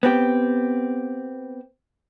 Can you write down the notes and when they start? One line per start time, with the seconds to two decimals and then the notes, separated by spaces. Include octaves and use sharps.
0.03 B3 C4 G4